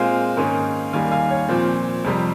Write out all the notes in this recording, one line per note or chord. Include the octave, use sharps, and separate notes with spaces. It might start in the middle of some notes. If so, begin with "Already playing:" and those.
Already playing: A#2 G#3 C4 F5 G#5
G#2 D#3 A#3 C#4
D#2 D#3 G3 F5 G#5
F5 G#5
C#5
A#2 F3 C4
F2 C3 G3